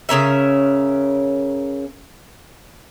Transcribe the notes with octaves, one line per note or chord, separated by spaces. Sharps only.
C#3 C#4 A#4 E5